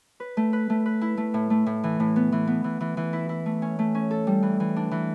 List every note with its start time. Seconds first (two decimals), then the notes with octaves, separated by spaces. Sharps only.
0.20 B4
0.37 A3
0.53 B4
0.70 A3
0.86 B4
1.01 E4
1.17 A3
1.34 A2
1.50 A3
1.66 A2
1.84 E3
2.00 A2
2.16 B3
2.32 E3
2.47 B3
2.64 E3
2.81 E3
2.97 E3
3.13 E4
3.29 E4
3.46 A3
3.62 C#4
3.79 A3
3.95 C#4
4.11 A4
4.27 G3
4.43 E3
4.60 E3
4.76 D4
4.91 E3